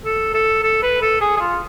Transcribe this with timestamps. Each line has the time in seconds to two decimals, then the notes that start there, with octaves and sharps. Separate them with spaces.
0.05 A4
0.34 A4
0.63 A4
0.82 B4
1.01 A4
1.21 G#4
1.36 G#4
1.40 F4